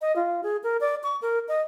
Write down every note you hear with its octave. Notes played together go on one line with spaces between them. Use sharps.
D#5
F4
G#4
A#4
D5
C#6
A#4
D#5